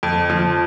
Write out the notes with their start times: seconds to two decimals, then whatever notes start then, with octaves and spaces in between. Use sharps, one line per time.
0.03 F2
0.30 F3